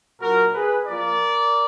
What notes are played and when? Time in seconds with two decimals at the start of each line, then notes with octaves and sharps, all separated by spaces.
0.21 A#2 F#3 D4 F#4 A#4
0.54 G#4 B4
0.87 F3 A#3 F4 A#4 D5